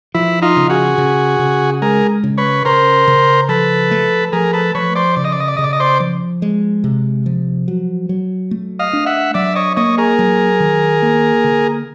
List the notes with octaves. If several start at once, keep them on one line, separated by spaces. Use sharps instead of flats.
F3 E4
D#4 F4
C#3
F#4 G#4
C#3
C#3
G#3 G#4 A#4
C#3
B4 C#5
C#3 A#4 C5
C#3
F3 A4 B4
A3
F3 G#4 A#4
A4 B4
F3 B4 C#5
C5 D5
C#3 D5
D#5
D5
D#5
D5
C#3 D#5
D5
D#5
C5 D5
F3
G#3
C3
F3
F#3
F#3
A3
D#5 F5
D4
E5 F#5
F#3 D5 E5
C#5 D#5
A#3 C#5 D#5
G#4 A#4
F#3
D#3
A#3
D3